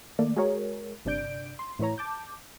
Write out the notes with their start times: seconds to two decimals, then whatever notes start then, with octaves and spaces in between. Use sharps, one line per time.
0.19 D#3 A3 A#3 D5
0.36 G#3 F#4 G#4 A#4 C#5
1.05 G1 C3 D4 D5 G6 D7
1.59 C6
1.79 A2 E3 E4 C#5 A#5
1.98 A5 D6 G6